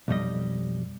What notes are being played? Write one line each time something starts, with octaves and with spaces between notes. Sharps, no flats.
B1 F2 G3 D#5